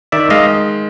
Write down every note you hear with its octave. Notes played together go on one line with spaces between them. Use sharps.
D#3 D5 E5
G#3 D#5 F5